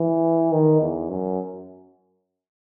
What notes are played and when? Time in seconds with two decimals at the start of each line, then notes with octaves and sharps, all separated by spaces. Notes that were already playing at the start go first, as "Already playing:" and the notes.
Already playing: E3
0.52 D#3
0.81 E2
1.09 F#2